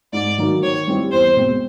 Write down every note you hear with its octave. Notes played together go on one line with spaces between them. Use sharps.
G#2 D5
D#3 F#3 A#3 D#4
D#3 C#5
G3 C4 E4 G4
E2 C5
B2 G#3 C4